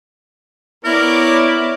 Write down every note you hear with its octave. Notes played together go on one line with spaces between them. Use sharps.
B3 E4 A#4 C#5 D5 D6